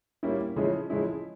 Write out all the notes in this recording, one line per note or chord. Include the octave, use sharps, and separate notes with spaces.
A#2 G3 A#3 C#4 E4
C#3 F3 G#3 C#4 E4
C#3 F3 G#3 C#4 E4